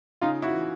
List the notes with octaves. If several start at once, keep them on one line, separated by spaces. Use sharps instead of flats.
C#3 D#4 F4
E4 F#4
E3